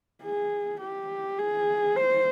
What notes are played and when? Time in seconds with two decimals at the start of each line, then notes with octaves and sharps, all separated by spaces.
0.23 G#4
0.81 G4
1.39 G#4
1.96 C5